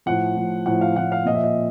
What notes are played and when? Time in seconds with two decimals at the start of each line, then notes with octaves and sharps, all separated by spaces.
0.06 A2 F3 F#5
0.37 A2 F3
0.66 A2 F3 F#5
0.81 F5
0.96 A2 F3 F#5
1.12 F5
1.26 A#2 D#5
1.30 F3 E5
1.44 D#5